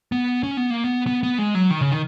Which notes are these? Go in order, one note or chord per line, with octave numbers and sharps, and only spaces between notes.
B3
C#4
B3
A#3
B3
B3
B3
G#3
F#3
D#3
C#3
D#3